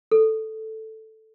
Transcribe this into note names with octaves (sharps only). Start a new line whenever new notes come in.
A4